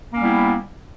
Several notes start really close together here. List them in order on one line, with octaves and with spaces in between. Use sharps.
A#3 C#4 G3 B3 E4